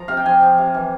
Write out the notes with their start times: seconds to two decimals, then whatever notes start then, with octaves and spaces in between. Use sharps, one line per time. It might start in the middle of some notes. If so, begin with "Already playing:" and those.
Already playing: F3 A#5
0.08 C3 F5
0.17 G5
0.26 F3 G#5
0.42 F3
0.58 C3
0.74 E3